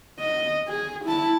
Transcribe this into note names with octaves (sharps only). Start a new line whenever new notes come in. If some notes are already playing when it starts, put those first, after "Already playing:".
D#5
G#4
E4 A5